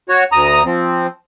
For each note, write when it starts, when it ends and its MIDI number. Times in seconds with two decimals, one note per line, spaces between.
0.09 0.24 66
0.09 0.24 73
0.32 0.62 38
0.32 0.62 82
0.32 0.62 87
0.65 1.07 53
0.65 1.07 60